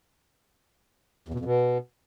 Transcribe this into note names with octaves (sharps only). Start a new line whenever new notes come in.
E2
B2
F2
B2